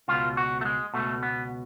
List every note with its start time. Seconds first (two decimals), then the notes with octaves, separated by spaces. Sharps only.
0.08 C#2 B2 F4
0.37 F#4
0.61 A3
0.65 G#3
0.94 C#2 B2 A3
1.23 B3